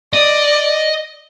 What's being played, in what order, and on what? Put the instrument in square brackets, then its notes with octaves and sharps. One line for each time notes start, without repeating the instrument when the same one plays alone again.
[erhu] D5 [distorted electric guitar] D#5